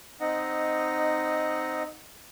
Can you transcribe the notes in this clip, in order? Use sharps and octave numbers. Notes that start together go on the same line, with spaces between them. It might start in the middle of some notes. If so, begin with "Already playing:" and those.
C4 D#4 D#5 F#5